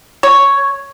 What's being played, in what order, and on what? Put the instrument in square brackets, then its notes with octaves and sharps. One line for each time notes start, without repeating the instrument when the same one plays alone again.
[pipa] C#5